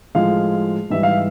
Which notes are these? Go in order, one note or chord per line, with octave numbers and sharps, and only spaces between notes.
A2 F3 G#3 F5
G#2 E3 G3 E5
F5